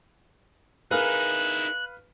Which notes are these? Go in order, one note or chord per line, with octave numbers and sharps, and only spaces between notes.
D#4 E4 G#4 A#4 B4 F5 F6 F#6